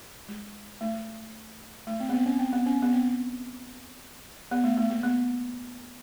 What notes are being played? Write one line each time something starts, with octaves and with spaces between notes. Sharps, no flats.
G#3
A3
A3
C4
B3
C4
C#4
C4
B3
C#4
B3
C4
B3
A3
A3
A#3
B3